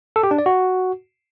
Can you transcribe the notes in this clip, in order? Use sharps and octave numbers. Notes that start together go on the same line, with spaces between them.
A4
G4
D4
D5
F#4